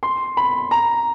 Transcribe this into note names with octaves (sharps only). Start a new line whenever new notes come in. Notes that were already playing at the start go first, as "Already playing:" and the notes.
C6
B5
A#5